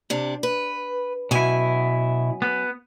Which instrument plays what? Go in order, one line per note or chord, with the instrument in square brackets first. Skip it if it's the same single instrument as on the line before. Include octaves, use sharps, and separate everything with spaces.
[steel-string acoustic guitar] C3 D4
B4
[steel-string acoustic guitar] F#2 G#5 [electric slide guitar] B2 E4
[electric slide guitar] B3